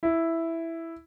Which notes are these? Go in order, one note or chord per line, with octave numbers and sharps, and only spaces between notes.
E4